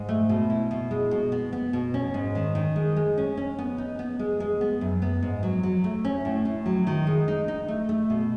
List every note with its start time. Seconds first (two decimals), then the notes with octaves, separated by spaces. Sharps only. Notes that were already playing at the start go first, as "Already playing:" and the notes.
Already playing: G#2
0.09 A3
0.29 B2
0.50 E4
0.71 B2
0.91 G#3
1.11 B2
1.32 B3
1.53 B3
1.73 B2
1.94 C#4
2.14 G#2
2.35 D#3
2.55 D#3
2.76 G#3
2.96 G#3
3.17 C#4
3.37 C#4
3.58 B3
3.78 D#4
3.99 B3
4.19 G#3
4.40 G#3
4.61 B3
4.81 F#2
5.02 B3
5.23 G#2
5.43 F#3
5.63 F#3
5.84 A3
6.05 C#4
6.25 A2
6.45 A2
6.66 F#3
6.87 D#3
7.07 G#3
7.28 D#4
7.48 D#4
7.68 A3
7.89 A3
8.10 B2